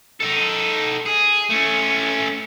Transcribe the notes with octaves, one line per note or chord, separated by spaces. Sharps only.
D#4 A4
G#4
A3 C#4